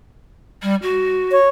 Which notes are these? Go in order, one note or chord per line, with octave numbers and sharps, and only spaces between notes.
G3
F#4
C#5